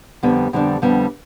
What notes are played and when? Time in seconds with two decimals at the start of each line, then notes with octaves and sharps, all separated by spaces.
0.23 F2 D3 G3 B3 D4
0.53 F2 D3 G3 B3 D4
0.82 F2 D3 G3 B3 D4